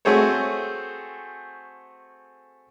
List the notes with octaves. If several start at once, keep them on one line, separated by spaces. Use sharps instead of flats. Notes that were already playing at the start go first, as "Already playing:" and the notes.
A3 C4 F#4 G#4 C5 C#5